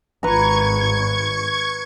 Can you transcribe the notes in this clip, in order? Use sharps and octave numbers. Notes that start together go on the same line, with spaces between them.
G#1 B4 A#5 C#6 G#6